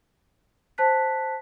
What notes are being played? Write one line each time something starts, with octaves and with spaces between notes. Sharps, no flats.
C5 A5 F#6 B6